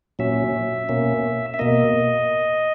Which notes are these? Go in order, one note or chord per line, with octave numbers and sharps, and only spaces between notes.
A#2 F#3 C#4 E5
B2 A#3 C#4
E5
B2 A#3 D#5